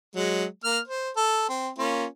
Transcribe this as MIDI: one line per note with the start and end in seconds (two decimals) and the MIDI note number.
0.15 0.45 54
0.15 0.45 56
0.64 0.79 58
0.64 0.79 89
0.88 1.10 72
1.16 1.44 69
1.49 1.69 60
1.78 2.05 58
1.78 2.05 61
1.78 2.05 65